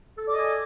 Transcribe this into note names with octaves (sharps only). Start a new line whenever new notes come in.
A4 D5 D#5 G#5 D6